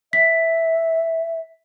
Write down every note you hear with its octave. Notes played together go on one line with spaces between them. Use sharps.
E5 B6